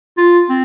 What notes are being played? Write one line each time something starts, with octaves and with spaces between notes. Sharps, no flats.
F4
C4